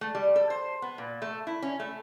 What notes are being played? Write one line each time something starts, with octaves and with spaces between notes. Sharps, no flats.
A3
G3
A4
C5
B3
A#2
A3
E4
C#4
A3